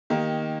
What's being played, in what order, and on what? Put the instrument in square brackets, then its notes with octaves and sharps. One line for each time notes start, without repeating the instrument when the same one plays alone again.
[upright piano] D#3 A#3 D#4 G4